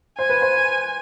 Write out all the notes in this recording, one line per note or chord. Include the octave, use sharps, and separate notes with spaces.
C5 G#5
B4
C5